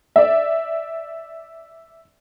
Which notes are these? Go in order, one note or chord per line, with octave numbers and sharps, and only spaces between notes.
D5 E5